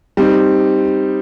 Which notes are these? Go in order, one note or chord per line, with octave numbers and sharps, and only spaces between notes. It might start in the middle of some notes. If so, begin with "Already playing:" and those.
G3 C4 D#4